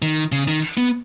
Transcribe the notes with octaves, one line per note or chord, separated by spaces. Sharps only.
D#3
C#3
D#3
B3